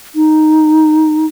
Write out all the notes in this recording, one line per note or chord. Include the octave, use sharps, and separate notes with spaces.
D#4